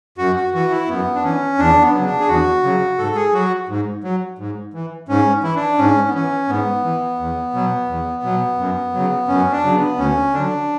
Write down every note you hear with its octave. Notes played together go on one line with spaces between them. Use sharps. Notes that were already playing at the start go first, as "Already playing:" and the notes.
F#2 F#4
F#4
E3 F#4
E4
F#2 B3
D4
E3 C#4
E2 D4
B3
C#3 F#3
D4
G#4
E2 F#4
C#3 F#3
G#2 A4
G#4
F#3 F#4
G#2
F#3
G#2
E3
G#2 C#4
E3 E4
D4
G#2 C#4
B3
E3 C#4
G#2 B3
E3
E2
B2 F#3
E2
B2 F#3
F#2
C#3 F#3
F#2 C#4
D4
C#3 F#3
B3
D2 C#4
D3 F#3 D4